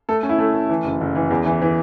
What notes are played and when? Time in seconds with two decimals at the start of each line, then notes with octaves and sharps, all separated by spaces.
0.09 A3 A4
0.23 C#4
0.29 E4
0.39 A3
0.54 A3
0.69 E3
0.85 F#1
1.01 F#1
1.15 E3
1.30 E2
1.45 E3
1.62 E3